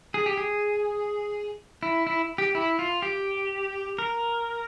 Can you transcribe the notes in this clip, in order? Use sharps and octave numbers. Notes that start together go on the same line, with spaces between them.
G#4
G4
G#4
E4
E4
G4
E4
F4
G4
A#4